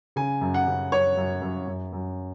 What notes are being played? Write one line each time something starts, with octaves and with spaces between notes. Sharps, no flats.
C#3 G#5
F#2
F#5
C#3
F#2 C#5
F#2
F#2
F#2
F#2